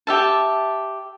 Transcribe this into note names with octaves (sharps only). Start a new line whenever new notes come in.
G4 E5 A5